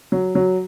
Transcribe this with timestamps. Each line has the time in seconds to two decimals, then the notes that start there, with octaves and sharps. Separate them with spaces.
0.12 F#3
0.35 F#3